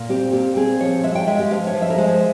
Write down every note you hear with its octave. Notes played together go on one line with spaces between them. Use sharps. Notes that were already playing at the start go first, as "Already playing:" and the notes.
Already playing: A#2
C4 G4
A#2 G4
C4 G#4
F3 C#5
G#3 E5
G5
G#3 E5
G4
F3 F5
C#5
F3
E5
A#4
G#3 C5